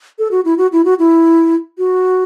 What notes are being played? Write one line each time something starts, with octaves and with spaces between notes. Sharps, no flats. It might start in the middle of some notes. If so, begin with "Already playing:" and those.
A4
F#4
E4
F#4
E4
F#4
E4
F#4